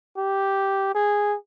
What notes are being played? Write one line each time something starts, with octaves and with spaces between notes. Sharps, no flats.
G4
G#4